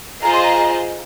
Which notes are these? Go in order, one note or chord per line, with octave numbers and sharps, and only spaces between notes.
F4 G#4 C5 D#5 A#5
C6
A#5